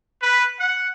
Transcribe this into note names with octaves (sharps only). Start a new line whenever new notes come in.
B4
F#5